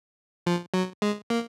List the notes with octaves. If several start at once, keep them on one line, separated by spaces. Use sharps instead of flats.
F3
F#3
G#3
A#3